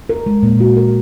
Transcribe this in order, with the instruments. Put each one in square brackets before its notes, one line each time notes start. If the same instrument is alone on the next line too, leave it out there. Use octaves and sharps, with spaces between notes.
[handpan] A#4
G#3
A#2
F#4
A#4